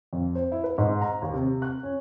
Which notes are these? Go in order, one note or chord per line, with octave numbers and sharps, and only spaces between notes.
F2
C5
E4
B4
G#2
A#5
D#2
C3
F#6
C#4